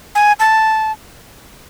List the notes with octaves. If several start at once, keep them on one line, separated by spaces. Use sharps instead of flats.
G#5
A5